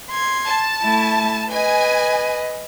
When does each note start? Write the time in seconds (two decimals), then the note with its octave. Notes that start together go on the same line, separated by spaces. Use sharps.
0.11 C6 G#6
0.45 A5
0.82 A3 E4
1.50 B4 D#5 G#5